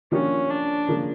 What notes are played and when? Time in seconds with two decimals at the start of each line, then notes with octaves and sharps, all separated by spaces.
0.12 F3 A#3 C#4 D4 G4
0.50 D4
0.88 C#3 F3 A#3